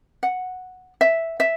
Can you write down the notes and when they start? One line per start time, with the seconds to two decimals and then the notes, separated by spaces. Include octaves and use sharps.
0.23 F#5
1.01 E5
1.40 E5